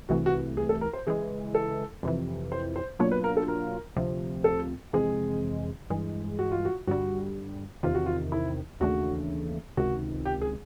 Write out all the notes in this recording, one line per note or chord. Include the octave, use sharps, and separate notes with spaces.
C2 C3 E3 A3 F#4
F#4
G#4
A4
A#4
C5
C#3 E3 G#3 G#4
A4
F2 C3 E3
C5
C5
B2 F#3 A#3 D4 F4 C#5
B4
A#4
A4
A#4
D2 C3 F3
A4
F2 C3 E3 G#3 C4 G#4
G2 E3 G#3
F#4
F4
F#4
G2 D3 G3 F#4
E2 C3 D#3 F4
F#4
F4
E4
D#2 C#3 E3 A3 D4 F#4
C#2 C3 D#3 F#4
G4
G#4